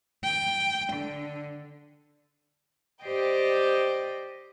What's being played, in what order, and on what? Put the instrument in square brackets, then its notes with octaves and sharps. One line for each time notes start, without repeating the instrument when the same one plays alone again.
[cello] G5
D3
[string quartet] G4 C5 D5 D#5 G5